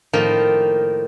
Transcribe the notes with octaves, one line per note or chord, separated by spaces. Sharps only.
A2 D#3 F3 A#3